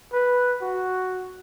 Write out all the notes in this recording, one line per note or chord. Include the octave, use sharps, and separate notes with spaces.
B4
F#4